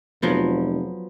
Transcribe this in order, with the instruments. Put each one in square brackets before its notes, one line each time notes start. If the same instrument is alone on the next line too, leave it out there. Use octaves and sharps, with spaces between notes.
[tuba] F1 [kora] F3 F#3 B3